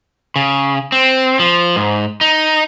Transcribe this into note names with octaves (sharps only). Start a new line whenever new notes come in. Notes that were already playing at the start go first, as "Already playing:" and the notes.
C#3
C4
F3
G#2
D#4